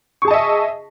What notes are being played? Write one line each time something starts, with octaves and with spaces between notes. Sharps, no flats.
G#4 D#5 E5 A5 C#6